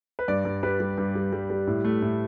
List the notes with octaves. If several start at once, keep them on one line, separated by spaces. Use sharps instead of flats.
B4
G2 D5
G2
G3 B4
G3
G2
G3
G3
G3
A2
A3
A2